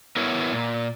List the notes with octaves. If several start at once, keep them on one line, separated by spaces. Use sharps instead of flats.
B3 E4 A#4 C#5
A#2